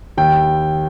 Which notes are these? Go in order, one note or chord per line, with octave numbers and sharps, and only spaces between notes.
D#2 G5